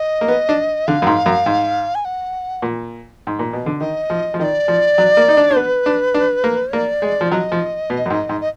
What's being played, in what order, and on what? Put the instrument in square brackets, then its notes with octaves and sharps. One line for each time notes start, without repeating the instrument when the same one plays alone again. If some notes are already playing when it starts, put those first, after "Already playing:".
Already playing: [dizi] D#5
[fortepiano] A#3
B3
D4
[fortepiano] D3 [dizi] F5
[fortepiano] F#2
G#2
F#2
G#2
[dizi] G#5
F#5
[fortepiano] A#2
G#2
A#2
B2
D3
[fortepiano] D#3 [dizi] D#5
[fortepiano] F3
F3
[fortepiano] D#3 [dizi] D5 D#5
[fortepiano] F3
F#3
A#3
D#4
D4
D4
[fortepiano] B3 [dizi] B4
[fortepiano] D4
D4
A#3
[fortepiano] A#3 [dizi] D5
[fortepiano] G#3
F3
[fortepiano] F#3 [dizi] D#5
[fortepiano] F3
B2
F#2
G#2
G#2
[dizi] D#5